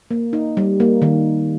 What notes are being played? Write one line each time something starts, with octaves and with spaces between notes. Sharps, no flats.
A#3
D#4
G3
A#3
D#3